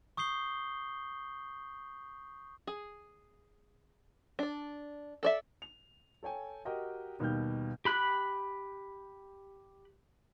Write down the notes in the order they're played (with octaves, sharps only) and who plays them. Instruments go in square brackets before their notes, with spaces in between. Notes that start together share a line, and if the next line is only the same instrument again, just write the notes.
[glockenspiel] C#6 D#6 G6 C7 G7
[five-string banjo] G#4
D4 D5
A4 D5 E5
[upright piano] F7
A4 C#5 G5 G#5
F#4 G4 A#4 D#5 G5
D#2 B2 D#3 G3 F6 G6
[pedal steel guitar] G4 B5 F#6